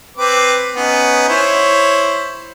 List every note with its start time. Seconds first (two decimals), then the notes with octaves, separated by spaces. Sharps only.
0.17 C4 B4 D6
0.75 B3 C#4 D#4
1.29 E4 C5 C#5